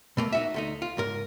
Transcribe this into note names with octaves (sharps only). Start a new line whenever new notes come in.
B2 A3 A#3
D#4 F#4 E5
D2 A3 D#4
F4
C#2 G#2 A#4